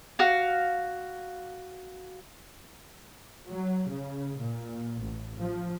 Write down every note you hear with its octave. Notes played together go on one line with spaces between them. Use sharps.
F#4 F5
F#3
C#3
A#2
A1
F3